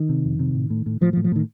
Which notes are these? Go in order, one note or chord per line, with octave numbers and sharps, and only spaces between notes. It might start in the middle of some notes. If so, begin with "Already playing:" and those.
Already playing: D#3
C3
F2
C3
A2
A2
A2
A2 F3
F3
A2
F3
A2 D#3